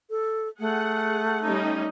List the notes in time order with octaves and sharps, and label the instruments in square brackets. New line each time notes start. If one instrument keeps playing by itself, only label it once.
[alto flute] A4
[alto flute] A3 [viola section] G#4 F#5
[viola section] G3 C#4 D#4